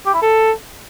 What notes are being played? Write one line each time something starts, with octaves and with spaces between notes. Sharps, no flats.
G4
E4
A4